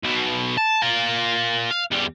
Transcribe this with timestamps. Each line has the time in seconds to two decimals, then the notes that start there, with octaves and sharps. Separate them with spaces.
0.03 B1 B2
0.58 A5
0.82 F4 A#4
1.71 F5
1.91 E2 G3